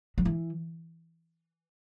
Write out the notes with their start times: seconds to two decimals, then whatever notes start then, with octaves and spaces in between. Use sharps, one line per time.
0.18 F#3
0.25 E3